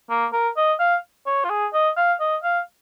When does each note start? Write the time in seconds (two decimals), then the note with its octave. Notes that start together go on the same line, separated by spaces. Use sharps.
0.10 A#3
0.32 A#4
0.57 D#5
0.79 F5
1.26 C#5
1.44 F4
1.50 G#4
1.73 D#5
1.97 F5
2.20 D#5
2.43 F5